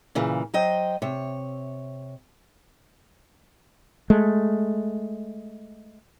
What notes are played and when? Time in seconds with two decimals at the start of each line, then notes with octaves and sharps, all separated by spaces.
0.15 A#2 C#3 E3
0.54 F#3 C5 D#5 G5
1.02 C3 C#5
4.10 G#3 A3